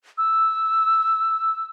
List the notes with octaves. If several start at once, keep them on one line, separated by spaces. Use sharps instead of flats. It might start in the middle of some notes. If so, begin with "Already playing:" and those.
E6